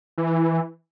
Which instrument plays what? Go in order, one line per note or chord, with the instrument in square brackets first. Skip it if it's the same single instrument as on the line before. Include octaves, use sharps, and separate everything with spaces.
[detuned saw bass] E3